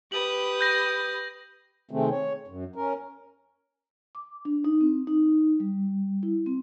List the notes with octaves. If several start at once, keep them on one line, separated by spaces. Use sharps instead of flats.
G4 B4 D#6 F#7
G6 A#6
C3 D#3 G#3 A3 C4
C#5
F#2
C#4 A#4
D6
D4
D#4
C4
D#4
G3
E4
C4